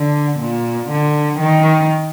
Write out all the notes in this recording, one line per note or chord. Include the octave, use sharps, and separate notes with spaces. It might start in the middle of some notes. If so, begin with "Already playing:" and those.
Already playing: D3
A#2
D3
D#3